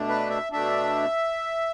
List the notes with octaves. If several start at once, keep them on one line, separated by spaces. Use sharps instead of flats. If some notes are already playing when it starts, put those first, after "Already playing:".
Already playing: B2 A3 D4
B4
E5
B2 A3 D4 E5